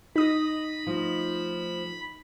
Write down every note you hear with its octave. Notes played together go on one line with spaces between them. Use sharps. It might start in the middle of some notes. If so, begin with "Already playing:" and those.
D#4 B5 D#6 A#6
F3 A3